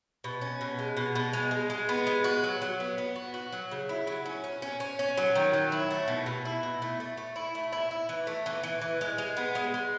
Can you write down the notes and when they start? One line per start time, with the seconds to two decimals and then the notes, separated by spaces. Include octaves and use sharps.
0.24 B2
0.41 C#4
0.61 B2
0.79 G#3
0.97 B2
1.15 B2
1.33 G#3
1.51 G#3
1.70 G#3
1.89 B3
2.07 G#3
2.24 F#4
2.44 F#3
2.62 F#3
2.80 B3
2.98 B3
3.15 F#4
3.34 F#4
3.52 F#3
3.71 C#3
3.89 E4
4.07 F#3
4.26 C#4
4.44 C#4
4.62 C#4
4.80 C#4
4.99 C#4
5.17 F#3
5.35 D#3
5.53 F#3
5.72 E4
5.91 A3
6.08 B2
6.26 B2
6.45 E4
6.63 B2
6.82 A3
7.00 A3
7.17 A3
7.36 E4
7.55 A3
7.72 E4
7.91 E4
8.09 E3
8.27 A3
8.46 E3
8.63 E3
8.82 E3
9.01 G#3
9.18 G#3
9.37 B3
9.55 G#3
9.74 G#3